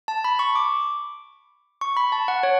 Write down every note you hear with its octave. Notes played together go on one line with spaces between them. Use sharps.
A5
B5
C#6
D6
C#6
B5
A5
F#5
C#5